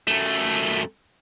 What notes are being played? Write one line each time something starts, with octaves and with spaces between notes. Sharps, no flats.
F#2 A3